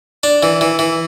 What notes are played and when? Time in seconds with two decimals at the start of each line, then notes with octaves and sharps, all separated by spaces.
0.23 D4
0.43 E3
0.61 E3
0.79 E3